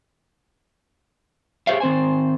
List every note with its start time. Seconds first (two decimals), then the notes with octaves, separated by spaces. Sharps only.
1.67 G4 G#4 C5 C#5 E5 F5
1.80 D#3 C4 C5 G#5